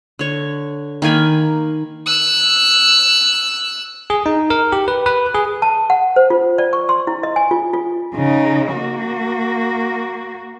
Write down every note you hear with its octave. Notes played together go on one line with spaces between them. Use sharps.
D3 C#5
D#3 A#3 G#5 B5
E6 F#6
G#4
D#4
A#4
G4
B4
B4
G#4
A5
F#5
C5
F4
D5
C#6
C6
E4
D#5
G#5
F4
F4
C#3 D#4
A#3 F#4